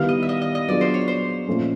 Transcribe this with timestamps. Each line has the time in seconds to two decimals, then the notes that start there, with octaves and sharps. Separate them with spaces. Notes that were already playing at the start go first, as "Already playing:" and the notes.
Already playing: D#3 G3 B3 E4 F5
0.09 D#5
0.23 E5
0.29 D#5
0.42 D#5
0.55 D#5
0.68 F#3 B3 D4 F4 G#4 D5
0.81 C5
0.94 C#5
1.08 C5
1.47 A#2 F3 A3 C#4